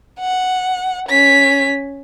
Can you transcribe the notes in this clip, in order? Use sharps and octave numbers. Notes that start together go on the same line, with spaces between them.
F#5
C#4 B6